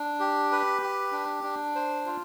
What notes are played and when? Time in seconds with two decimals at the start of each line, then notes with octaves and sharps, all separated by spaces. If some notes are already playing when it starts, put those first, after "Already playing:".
Already playing: D4
0.20 G4
0.52 B4
0.82 G4
1.12 D4
1.43 D4
1.75 C5
2.05 F4